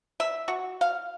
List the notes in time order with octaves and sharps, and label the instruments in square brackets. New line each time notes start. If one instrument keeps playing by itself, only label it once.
[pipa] E5
F#4
F5